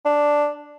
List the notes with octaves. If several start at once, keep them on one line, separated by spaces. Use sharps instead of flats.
D4